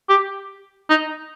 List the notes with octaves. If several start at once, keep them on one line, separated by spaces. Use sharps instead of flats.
G4
D#4